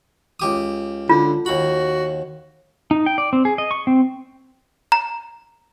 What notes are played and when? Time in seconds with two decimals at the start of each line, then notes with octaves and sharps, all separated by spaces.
0.40 C#2 G4 D#6
1.09 D3 F4
1.46 D#2 F#4 B5
2.91 D#4
3.06 G5
3.18 D5
3.33 C4
3.45 G#4
3.58 D#5
3.71 C#6
3.87 C4
4.92 A#5